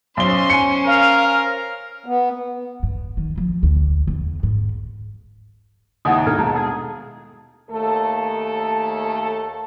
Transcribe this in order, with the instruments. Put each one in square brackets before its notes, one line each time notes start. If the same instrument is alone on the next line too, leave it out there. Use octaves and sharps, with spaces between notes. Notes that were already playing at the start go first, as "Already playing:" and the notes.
[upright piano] B1 G7 [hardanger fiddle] C#4 C5 [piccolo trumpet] C6
[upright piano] G#5 C#7
[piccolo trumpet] A#4 [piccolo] F5
[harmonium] B3
[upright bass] G2
D#3
F3
D2
E2
G#2
[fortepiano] D#2 G#2 E4 [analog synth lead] D#4 [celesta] F#5 D#6
[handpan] B2 A4 [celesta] D4 F6 G#6
[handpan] G#3 A4 F5 [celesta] A5 A#5
[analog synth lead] G#4
[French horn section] D#2 A3 A4